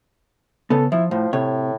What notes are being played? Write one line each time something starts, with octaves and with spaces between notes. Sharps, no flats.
C#3 B3 A4
F3 E4
A2 F3
A2 C3 C#5